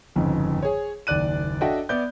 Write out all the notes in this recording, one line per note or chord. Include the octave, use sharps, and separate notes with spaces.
G1 F2 G#2 C#3
G#4 C#5
F#1 D#2 D5 F#6 D#7
D4 F#4 A4 D#5 E5 G5
B3 D5 E5 G6